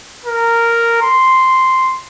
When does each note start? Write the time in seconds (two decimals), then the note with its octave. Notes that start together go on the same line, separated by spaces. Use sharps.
0.25 A#4
1.02 C6